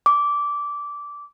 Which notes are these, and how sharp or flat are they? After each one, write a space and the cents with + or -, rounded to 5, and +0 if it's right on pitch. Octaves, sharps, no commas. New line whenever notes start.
D6 -15